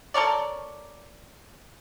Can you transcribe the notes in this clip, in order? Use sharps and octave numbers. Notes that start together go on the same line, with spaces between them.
A4 A#4 C#5 D5